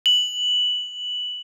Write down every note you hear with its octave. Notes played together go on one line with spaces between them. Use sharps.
F#7